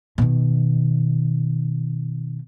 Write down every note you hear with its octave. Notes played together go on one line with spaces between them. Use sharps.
B2 D#3